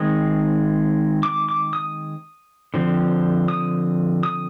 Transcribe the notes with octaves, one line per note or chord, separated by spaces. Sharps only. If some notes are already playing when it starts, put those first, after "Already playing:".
Already playing: D#3 G#3 C4 D#6
D6
D6
D#6
D3 F3 C4
D#6
D#6